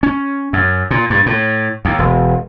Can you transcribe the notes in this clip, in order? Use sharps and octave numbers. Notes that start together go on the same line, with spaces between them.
C#4
F#2
A#2
G2
A2
D#2
E1